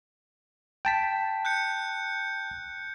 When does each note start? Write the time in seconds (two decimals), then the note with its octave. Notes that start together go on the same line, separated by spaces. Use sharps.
0.85 G5 A5 B6
1.45 F#6 G6 C#7